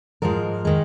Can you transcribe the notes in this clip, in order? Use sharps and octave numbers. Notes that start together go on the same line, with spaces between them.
G#2 F3 G#3 A#4
D#3 G#3